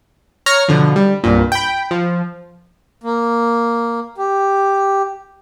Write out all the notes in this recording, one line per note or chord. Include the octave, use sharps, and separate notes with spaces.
C#5 A#5 F6 A#6
B2 D3 F3
G3
C2 G2 A#2
G5 B5
F3
A#3
G4